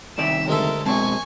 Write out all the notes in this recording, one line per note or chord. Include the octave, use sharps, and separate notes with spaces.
C2 D#3 D5 E5 E7
D2 G#3 A4 A#4 E5
A#1 B2 G#3 C4 G#5 A5 C#6